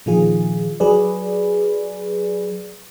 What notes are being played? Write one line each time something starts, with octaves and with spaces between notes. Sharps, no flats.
A#2 D#3 F3 F4 G#4
F#3 G#4 B4 D5